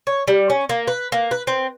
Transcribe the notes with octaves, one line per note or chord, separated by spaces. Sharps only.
C#5
G3
C#4
A#3
B4
A#3
B4
C4